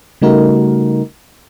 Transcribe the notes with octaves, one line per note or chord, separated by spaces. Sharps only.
C#3 G3 A3 D#4 F#4 A#4